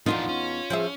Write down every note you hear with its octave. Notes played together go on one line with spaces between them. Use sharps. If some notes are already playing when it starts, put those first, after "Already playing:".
E2 F3 B3 D4 D#4 F4
C#4
F3 G#4 E5